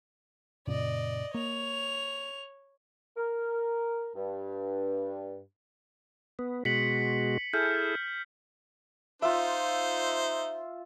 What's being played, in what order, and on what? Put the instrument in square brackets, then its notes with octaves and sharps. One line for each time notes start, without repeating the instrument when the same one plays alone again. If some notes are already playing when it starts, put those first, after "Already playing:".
[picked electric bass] F#2 A#2 C#3 [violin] D5 D#5
[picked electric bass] A#3 [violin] C#5 F7
[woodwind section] A#4
G2
[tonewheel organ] B3
[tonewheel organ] B2 G#3 F#4 [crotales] B6 C#7 F#7
[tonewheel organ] E4 G#4 A4 [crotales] F6 G6
[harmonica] D#4 C5 [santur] F4 E5